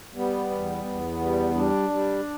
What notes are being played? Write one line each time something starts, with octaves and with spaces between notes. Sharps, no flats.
G3 B3
E2
E2
G3
G3 D4
G3